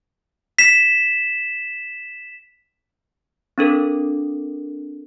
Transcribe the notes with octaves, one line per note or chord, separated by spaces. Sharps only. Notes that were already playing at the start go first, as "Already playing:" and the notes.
B6 E7
C4 D4 A4 A#4